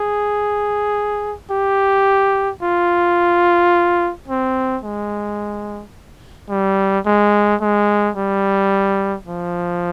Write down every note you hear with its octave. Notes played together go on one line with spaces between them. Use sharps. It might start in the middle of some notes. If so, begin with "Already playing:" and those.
Already playing: G#4
G4
F4
C4
G#3
G3
G#3
G#3
G3
F3